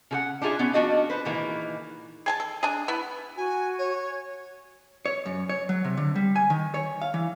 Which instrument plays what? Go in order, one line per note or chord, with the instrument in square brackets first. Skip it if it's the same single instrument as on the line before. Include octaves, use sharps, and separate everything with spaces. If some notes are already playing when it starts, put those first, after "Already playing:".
[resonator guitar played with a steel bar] C#3 G#4 F#5
D4 D#4 F4 G#4 E5
B3 C#4
F3 D4 F#4 D#5 F5
B4 C5
A#2 D#3 E3 G#3 A#3
[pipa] G#4 G#5 A5
A4
D4 G#4
B3 E4
[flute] F#4 [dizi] G#5
[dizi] C#5
[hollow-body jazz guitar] C#5
F#2
C#5
F#3
C3
D3
G3
G#5
D#3
C#5
F5
E3